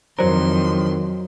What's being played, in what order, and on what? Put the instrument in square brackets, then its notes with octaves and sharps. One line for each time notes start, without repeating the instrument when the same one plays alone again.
[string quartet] F2 C6 [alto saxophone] D#3 [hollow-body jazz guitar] F#3 A#4 [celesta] E4 C5 D5